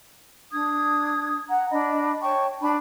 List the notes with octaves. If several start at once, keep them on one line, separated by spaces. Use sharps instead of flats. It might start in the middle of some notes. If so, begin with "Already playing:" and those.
D4 D#6 G#6
F#5 A#5
D4 D#5 B5
C#5 G5 A5 C#6
D4 A5 B5